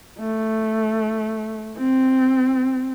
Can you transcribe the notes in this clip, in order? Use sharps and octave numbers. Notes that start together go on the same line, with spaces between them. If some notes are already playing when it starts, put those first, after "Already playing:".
A3
C4